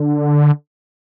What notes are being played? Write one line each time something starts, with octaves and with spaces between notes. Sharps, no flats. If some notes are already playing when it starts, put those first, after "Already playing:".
Already playing: D3